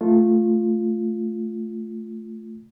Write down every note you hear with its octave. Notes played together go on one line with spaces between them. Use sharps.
A3 F4